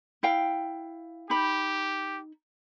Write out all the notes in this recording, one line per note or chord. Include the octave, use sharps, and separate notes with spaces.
E4 F5 G5
D#4 G4 B5